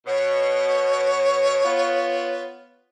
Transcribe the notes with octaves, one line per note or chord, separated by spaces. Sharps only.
B2 C#5
B3 F4